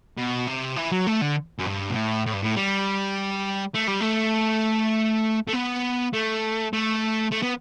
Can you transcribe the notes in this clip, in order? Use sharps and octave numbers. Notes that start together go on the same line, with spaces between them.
B2
C3
E3
F#3
A3
D3
F#2
G2
B2
A2
A2
G2
A2
G3
A3
G3
A3
A3
B3
A3
A3
A3
B3